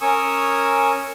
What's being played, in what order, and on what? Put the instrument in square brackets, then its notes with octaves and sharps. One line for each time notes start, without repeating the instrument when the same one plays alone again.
[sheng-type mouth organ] C#4 A#4 G#5 C#6 D#6 E6